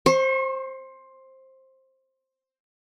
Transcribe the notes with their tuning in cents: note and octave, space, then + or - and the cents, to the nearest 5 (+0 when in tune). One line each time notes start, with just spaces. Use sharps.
C5 +15 C#6 -40